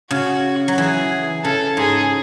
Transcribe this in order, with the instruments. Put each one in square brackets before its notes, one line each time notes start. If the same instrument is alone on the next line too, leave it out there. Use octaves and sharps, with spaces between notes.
[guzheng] C#3 [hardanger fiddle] F#4
[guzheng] F#3
[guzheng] E3 [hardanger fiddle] G#4
[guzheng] C#3 [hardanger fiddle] A4
[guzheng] G#2 [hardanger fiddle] G#4